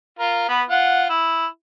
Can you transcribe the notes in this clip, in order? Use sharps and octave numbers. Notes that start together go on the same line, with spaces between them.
F4 A#4
B3 B4
F4 F#5
E4